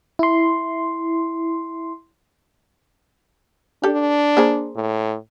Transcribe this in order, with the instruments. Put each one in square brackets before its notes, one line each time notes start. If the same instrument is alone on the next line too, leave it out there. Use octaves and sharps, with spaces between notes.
[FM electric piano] E4 C6
[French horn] D4 [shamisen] G4 A4
[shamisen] A#3 G#4 C5
[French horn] A2